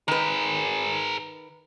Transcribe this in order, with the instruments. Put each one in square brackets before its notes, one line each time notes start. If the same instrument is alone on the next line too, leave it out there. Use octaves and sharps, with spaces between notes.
[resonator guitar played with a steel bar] D#3 B4 [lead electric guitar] G#4 A#4